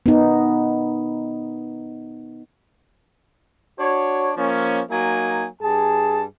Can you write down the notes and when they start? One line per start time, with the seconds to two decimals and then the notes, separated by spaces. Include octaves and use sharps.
0.06 B3 D#4
3.79 D4 F#4 C#5
4.37 F3 A#3 C#4
4.90 F#3 A#3 D#4 G#5
5.61 G2 G#4 A5